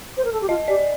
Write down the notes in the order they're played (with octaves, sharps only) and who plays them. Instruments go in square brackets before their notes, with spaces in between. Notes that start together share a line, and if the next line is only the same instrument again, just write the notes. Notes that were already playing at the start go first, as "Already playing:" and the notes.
[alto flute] C5
A#4
A4
G4
[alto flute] F4 [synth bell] D#5
[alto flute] G4 [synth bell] D5